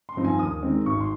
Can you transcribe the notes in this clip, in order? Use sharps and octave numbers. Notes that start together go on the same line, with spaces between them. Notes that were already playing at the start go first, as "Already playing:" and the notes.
C6
G2 F3 C4 D#4
G#5
D#2 D#6
D#3 G#3 C4 D#4
G#1 C#6
C6